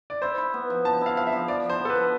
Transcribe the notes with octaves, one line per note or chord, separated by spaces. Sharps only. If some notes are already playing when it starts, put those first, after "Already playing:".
D5
E4 C5
E4
B3
F3
F3 A5
E4 F5
F3 F5
E5
F3
F3 D5
F3
C5
B3
A4
B4
F3